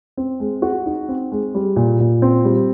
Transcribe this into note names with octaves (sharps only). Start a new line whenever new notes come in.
C4
G#3
F#4
D#4
C4
G#3
G3
A#2
A#2
C4
G3